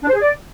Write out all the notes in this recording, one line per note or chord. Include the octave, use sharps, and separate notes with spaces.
D4
C5
G#4
D5